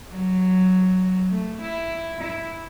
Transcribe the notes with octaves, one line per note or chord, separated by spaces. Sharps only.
F#3
A3
E4
E4